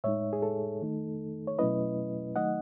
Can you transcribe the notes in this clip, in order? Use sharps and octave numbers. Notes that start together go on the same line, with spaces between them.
A2 G#3 D#4 C#5 E5
G#4
A4
D#3 A3 D#4
C#5
B2 F#3 A3 C#4 E4 B4 D#5
D#3 F#3 A3 D#4 D#5 F#5